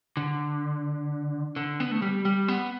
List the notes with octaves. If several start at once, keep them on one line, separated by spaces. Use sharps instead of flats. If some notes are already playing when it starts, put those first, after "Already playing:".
D3
D3
B3
A3
G3
G3
B3